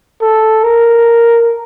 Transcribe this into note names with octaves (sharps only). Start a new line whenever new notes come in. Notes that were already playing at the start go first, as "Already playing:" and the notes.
A4
A#4